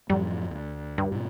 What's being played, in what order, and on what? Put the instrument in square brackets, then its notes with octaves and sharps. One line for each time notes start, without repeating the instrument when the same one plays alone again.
[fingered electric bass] F#2 A2 F3 [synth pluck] G3
[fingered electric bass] D2
[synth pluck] G2
[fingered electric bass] G#2 B2